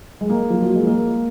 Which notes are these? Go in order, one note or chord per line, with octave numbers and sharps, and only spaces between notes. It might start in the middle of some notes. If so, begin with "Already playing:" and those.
G#3
A#3
F3
F#3
G#3
A#3